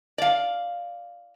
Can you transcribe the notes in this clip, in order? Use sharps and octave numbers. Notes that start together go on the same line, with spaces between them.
D5 F5